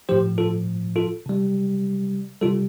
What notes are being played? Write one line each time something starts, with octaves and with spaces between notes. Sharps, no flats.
A2 F3 G4 C5
F4 A4
F4 A4
C3 G3
C3 G3 F4 A4